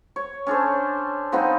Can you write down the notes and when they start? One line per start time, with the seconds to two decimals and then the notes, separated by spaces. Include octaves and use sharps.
0.16 C#5
0.47 C#4 D4 A4 C5
1.32 F3 B3 C4 D#4